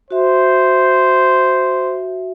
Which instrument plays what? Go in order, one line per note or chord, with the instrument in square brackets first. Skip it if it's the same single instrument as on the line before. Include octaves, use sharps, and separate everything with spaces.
[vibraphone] F#4 E5 [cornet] C5